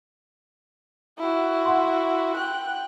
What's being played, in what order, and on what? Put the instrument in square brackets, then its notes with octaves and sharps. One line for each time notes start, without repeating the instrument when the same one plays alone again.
[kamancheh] E4 F#4
[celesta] F#5 C6
[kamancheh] G5 F#6